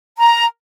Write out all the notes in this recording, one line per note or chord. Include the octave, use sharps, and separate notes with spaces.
A#5